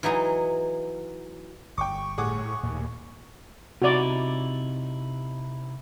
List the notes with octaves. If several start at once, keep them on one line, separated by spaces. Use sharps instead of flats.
E3 F#3 D#4 G#4
G1 G5 C#6 D6
A2 G#4 F#5 D6
D#2 A#2 A3
C3 D#4 E4 F#4 D5